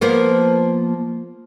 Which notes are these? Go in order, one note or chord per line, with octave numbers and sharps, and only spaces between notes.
F3 A#3 B3